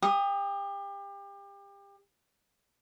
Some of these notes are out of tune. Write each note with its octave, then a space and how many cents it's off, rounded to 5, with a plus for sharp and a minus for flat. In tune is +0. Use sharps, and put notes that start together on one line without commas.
G4 +30 D#6 +0